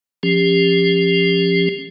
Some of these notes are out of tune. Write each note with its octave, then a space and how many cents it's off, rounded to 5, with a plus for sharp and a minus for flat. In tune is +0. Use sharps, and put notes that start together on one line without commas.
F3 +0 C#4 +0 G4 +25